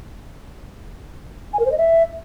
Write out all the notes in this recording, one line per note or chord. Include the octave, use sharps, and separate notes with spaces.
G#5
A#4
C5
D#5
E5